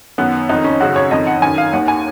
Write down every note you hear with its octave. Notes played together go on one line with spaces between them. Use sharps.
F#2 D#3 B3
F2 D#3 D#4
C#4
F#2 C#3 F#4
C#5
F2 D#3 D#5
F#5
F#2 D#3 G#5
F5
D#2 D#3 F#5
G#5